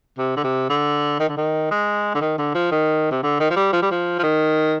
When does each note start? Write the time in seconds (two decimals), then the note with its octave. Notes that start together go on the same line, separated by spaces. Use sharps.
0.18 C3
0.36 D3
0.44 C3
0.69 D3
1.20 D#3
1.28 D3
1.37 D#3
1.71 G#3
2.14 D3
2.21 D#3
2.38 D3
2.54 F3
2.71 D#3
3.11 C3
3.23 D3
3.40 D#3
3.50 F3
3.56 G3
3.73 F3
3.82 G3
3.91 F3
4.19 F3
4.23 D#3